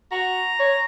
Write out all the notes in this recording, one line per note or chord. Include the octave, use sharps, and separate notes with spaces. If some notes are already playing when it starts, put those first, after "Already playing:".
F#4 A#5
C#5